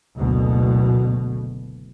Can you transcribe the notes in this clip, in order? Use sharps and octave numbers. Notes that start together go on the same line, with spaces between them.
F#1 D2 B2